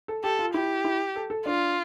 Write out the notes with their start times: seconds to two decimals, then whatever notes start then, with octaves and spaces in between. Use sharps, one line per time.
0.08 A4
0.24 G4 A4
0.39 F4
0.54 E4 G4
0.85 E4
1.16 A4
1.30 A4
1.46 D4 F4